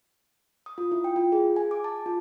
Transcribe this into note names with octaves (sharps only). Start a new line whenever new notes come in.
D#6
F4
E4
G5
F4
G#4
G#5
D6
A5
F4